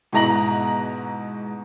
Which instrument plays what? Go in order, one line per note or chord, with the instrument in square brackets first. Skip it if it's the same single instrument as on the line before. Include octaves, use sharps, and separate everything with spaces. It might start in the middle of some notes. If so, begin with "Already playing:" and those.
[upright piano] G#2 B2 E4 A#5 A#6 F#7